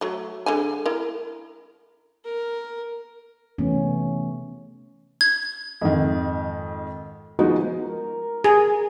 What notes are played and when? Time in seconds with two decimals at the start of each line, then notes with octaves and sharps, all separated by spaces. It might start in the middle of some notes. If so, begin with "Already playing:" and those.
0.01 F#3 A3
0.46 D3 G#3 G#5
0.86 E4 A#4
2.25 A#4
3.58 C3 E3 A3 B3 C#4
5.21 G#6
5.81 F2 G#2 D#3
7.39 F3 G#3 B3 D#4 F#4
7.81 A#4
8.44 G#4